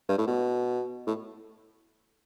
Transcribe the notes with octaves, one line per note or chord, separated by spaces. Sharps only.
G2
A2
B2
A2